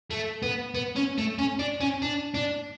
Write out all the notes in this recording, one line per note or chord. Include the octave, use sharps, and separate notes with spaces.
A3
B3
B3
C#4
A3
C#4
D4
C#4
D4
D4